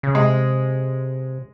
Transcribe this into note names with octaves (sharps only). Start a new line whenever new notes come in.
C#3
C3 G#3